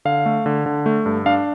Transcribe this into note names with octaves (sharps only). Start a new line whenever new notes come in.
D3 F5
A3
D3
D3
A3
G2
D4 F5